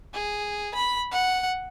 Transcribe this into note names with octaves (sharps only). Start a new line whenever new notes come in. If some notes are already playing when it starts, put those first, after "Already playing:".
G#4
B5
F#5